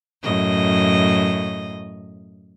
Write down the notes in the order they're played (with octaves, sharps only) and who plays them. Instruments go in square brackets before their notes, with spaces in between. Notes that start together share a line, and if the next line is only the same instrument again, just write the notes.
[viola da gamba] F#2 A2 D#5